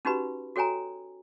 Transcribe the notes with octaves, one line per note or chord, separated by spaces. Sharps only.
C#4 D#4 F#4 G4 B4 B5
F#4 A4 C#5 G5 G#5 A#5